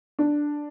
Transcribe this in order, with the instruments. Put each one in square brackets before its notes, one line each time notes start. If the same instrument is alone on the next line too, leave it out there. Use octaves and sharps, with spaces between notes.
[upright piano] D4